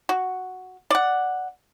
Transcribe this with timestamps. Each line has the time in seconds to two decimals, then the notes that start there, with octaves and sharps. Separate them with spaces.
0.09 F#4
0.90 D5 F#5